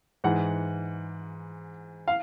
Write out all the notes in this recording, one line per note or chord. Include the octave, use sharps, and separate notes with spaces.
G#2 E3 F#5
F5